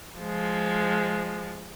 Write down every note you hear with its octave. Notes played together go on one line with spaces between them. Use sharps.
F3 G#3